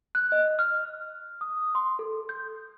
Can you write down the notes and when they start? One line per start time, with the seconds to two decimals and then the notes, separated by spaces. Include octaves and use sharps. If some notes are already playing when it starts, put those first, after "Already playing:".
0.15 F#6
0.32 D#5
0.59 F6
1.41 D#6
1.75 C6
1.99 A4
2.29 G6